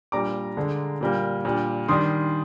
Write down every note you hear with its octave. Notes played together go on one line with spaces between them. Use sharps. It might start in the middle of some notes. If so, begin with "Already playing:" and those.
A#2 G3 D4 A#5 D6
D3 G#3 D4
A#2 G3 A#3
A#2 G3 D4
D#3 G3 D4 C6 D#6